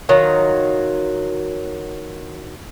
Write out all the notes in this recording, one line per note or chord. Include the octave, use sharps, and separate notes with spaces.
D#3 F#3 F4